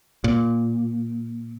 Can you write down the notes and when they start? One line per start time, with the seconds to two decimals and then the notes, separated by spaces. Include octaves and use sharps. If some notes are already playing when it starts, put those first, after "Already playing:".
0.24 A#2